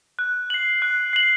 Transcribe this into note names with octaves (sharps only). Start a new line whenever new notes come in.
F#6
C7 F#7
F#6
C7 F#7